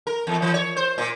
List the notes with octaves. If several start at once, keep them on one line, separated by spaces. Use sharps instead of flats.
A#4
E2
E3
C#5
C5
A#2